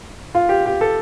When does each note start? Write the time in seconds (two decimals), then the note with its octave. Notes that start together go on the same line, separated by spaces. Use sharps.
0.35 F4
0.49 G4
0.66 G4
0.81 A4